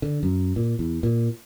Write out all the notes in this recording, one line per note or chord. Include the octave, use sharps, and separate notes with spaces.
D3
F#2
A#2
E2
A#2